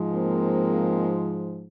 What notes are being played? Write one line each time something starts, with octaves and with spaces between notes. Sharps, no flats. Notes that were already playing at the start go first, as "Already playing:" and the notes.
Already playing: G#2 F3 G#3
A#3 C4